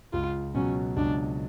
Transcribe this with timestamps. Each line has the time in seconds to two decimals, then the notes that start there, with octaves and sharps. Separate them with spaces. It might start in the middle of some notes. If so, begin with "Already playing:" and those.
0.13 C#2 F4
0.55 B2 F#3 C#4
0.96 C#2 D4